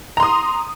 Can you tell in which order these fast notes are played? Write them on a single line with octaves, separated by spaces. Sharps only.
A#5 C6 D#6